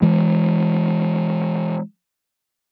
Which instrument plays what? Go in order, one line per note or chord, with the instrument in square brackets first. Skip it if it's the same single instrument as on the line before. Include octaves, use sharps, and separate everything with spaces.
[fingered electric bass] E3 G#3